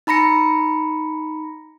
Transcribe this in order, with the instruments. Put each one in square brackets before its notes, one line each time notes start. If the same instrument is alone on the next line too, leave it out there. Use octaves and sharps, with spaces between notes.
[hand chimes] D#4 A#5 B5 A#6 C#7